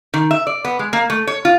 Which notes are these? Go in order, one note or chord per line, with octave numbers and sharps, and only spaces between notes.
D#3
E5
D5
B3
G#3
A#3
A3
C#5
F4